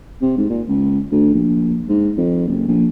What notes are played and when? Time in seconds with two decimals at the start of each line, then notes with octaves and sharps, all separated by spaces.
0.21 C3
0.37 G#2
0.49 A#2
0.68 C#2
1.12 D2
1.34 A#1
1.89 G#2
2.17 F2
2.47 F#1
2.68 A#1